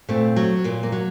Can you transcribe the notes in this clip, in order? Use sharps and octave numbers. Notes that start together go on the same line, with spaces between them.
A#2 A3 C4
F#3
A#2 A#3
A#3
F#3